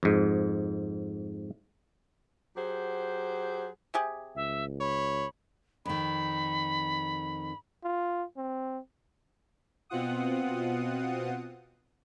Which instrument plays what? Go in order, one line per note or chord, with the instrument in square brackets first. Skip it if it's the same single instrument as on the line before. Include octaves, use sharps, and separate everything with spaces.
[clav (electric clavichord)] F2 G#2
[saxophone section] F#3 G4 G#4 C5 F#5
[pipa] C3 G4 G#4
[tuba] C#2 [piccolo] E5
[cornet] C#5 [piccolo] B5
[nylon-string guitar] F2 D#3 [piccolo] B5
[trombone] F4
C4
[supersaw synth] B2 C4 F4 F#5 D#6